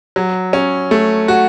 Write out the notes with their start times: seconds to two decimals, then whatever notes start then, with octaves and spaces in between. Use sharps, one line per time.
0.16 F#3
0.53 C#4
0.91 A3
1.28 F#4